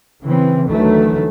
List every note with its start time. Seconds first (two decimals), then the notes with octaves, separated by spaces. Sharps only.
0.23 C#3 E3 C4
0.68 D2 D#3 E3 F#3 A3